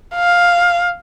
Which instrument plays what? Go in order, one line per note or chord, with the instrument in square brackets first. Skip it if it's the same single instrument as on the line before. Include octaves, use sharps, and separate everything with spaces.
[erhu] F5